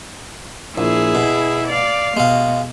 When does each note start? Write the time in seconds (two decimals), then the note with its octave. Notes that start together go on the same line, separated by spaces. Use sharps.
0.78 A#1 E4 G#4
1.15 B2
1.67 D5 F5
2.17 B2 G#3 F5